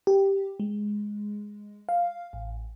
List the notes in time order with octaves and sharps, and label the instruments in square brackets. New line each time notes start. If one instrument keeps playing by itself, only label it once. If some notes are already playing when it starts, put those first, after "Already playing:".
[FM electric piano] G4
G#3
F5
A1